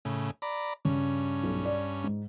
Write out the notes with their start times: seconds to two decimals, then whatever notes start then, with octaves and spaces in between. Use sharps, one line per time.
0.05 A2 C#3
0.42 D5 A#5 B5
0.85 G2 C#3 C#4
1.43 B1
1.65 D5
2.04 G#2